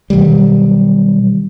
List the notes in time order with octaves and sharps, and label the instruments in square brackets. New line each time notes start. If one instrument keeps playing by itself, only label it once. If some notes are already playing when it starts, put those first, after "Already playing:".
[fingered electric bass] B2 D#3 F#3 G3